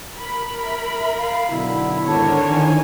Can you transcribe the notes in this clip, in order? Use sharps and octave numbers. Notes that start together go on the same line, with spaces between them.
A#4 B5
E5
F5
B1 B2 D3 E4
G#1 D3 D4 A#4 C#5 A5
D#3 E3 G#5